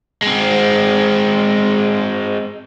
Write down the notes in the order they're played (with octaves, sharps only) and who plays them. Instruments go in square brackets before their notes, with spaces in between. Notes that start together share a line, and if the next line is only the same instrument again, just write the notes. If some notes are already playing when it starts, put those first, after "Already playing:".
[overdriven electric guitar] G#3 C4